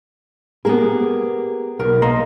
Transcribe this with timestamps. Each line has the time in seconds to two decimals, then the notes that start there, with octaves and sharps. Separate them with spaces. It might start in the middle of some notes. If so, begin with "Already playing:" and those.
0.65 A#3 B3 G4 G#4 A#4
1.79 B1 A#4 B4
2.02 A#3 D#5 A#5 C6